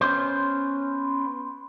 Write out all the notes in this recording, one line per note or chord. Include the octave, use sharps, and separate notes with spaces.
B3 C#4 C5